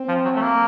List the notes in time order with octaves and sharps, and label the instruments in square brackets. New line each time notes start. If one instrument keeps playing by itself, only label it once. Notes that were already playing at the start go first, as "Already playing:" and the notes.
Already playing: [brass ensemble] C4
[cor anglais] F3
F#3
A3
A#3